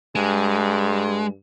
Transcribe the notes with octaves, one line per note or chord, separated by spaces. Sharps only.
G2 G#3